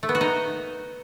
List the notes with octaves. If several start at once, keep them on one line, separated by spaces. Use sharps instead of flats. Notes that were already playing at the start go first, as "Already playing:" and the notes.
A3
B3
F#4
D#4